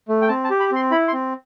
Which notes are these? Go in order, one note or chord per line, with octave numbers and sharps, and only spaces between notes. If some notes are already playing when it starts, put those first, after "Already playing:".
A3
G5
C4 A5
A5
G4
B5
C4 C6
E4 B5
C6
C4